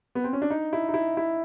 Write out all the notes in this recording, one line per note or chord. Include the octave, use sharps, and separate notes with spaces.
B3
C4
C#4
D4
D#4
E4
D#4
E4
E4